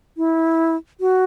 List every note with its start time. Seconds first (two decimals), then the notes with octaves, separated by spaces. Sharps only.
0.17 E4
1.00 F#4